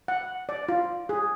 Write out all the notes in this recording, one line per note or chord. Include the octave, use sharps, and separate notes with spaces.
F#5
D5
F4
G#4